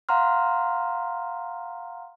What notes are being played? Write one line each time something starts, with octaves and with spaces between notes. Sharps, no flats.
F5 F#5 A#5 C6 F6